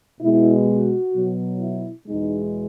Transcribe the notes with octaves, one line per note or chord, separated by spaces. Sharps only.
B2 G#3 E4
F#4
B2 F#3
E4
E2 B2 G#3 D#4